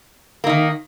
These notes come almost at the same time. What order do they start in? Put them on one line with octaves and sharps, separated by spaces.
A#3 D#4 D#3